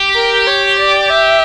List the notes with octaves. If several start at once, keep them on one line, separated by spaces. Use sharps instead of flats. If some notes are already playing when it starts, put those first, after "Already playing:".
Already playing: G4
A#4
C#5
D5
E5